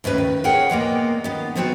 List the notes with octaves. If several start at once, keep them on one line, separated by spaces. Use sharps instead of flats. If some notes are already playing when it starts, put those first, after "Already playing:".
D#2 A2 C#3 B4
D#3
G#4 A#4 C#5 F#5 G5
A#2 G#3 A#3 B3
D#3 B3
F3 F#3 B3 C4 F#4